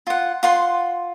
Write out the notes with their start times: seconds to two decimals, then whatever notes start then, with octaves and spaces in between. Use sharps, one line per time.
0.07 F4 F#5
0.43 F4 F#5 C6